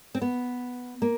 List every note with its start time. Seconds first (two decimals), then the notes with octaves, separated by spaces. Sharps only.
0.15 C4
0.22 B3
1.02 A#3